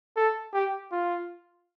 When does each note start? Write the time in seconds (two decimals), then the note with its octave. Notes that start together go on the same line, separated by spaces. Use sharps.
0.16 A4
0.54 G4
0.92 F4